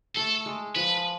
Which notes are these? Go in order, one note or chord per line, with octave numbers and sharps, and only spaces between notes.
A3 A4
G#3
F3 B4